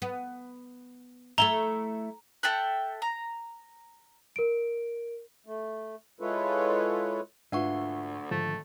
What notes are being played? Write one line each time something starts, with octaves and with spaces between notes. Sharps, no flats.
B3
A3 E4 E5 A#5 G7
A4 E5 G5 F#6
A#5
A#4 D7
A3
G#3 E4 F4 A4 B4 C#5
D2 G#2 D4 F4 B4 E5 F#5 C#6
G#1 G#2 D3 F3 A3